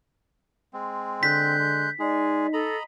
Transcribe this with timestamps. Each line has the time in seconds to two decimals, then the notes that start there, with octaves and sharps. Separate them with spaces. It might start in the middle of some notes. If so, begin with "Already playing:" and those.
0.73 G#3 C4
1.23 D3 F#6 G6 B6
1.58 G#3
2.00 G#3 D#4 G#4 D5
2.53 A4 D#5 A#5 B5